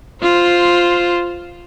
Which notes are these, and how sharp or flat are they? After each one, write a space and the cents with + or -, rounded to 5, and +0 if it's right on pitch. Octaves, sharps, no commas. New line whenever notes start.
F4 +0 C5 +0